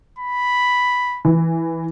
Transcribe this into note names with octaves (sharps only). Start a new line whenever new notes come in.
B5
E3